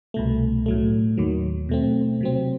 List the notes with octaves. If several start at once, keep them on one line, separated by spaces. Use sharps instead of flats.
C2 B2 A3
A2 F#3 A3
D#2 D#3 F#3
B2 A3 C4
C3 F#3 C4